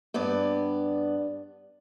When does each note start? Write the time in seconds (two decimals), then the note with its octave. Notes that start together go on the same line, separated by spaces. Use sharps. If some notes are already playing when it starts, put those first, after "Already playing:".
0.14 G2 B3 D5